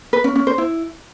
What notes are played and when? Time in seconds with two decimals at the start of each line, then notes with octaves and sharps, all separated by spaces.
0.13 B4
0.24 C#4
0.36 C#4
0.47 C5
0.58 E4